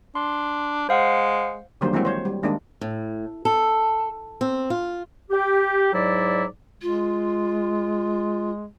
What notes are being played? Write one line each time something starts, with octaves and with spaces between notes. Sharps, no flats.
D4 C6
G#3 C5 F5 F#5
D3 D#3 F#3 G3 A#3 C5
E3 F#3 G#3 A#3 C4 F#4
C5 C#5
G3
D#3 G#3 A#3 D4
A2
A4
C4
F4
G4
G#2 F#3 E4 D5
G#3 F4